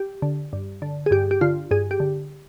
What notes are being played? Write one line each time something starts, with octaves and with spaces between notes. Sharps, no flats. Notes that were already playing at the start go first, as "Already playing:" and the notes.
Already playing: G4
D3
G2
D3
G#4
G2 G4
G4
D3 F4
G2 G#4
G4
D3